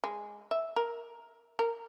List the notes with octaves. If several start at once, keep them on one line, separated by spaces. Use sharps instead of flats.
G#3
E5
A#4
A#4